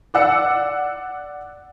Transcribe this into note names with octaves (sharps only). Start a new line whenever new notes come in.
D5 F#5 E6 C#7